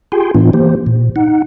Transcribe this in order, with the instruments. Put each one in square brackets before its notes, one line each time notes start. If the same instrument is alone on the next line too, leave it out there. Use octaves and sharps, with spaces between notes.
[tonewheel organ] F4 G4 G#4 G5 G#5 C6
A2 E3 B3 D4 F4
E3 A#3 G4 C5
A#2
D#4 F#5